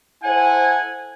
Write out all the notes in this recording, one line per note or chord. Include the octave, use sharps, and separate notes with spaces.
E4 A4 C5 F#5 G#5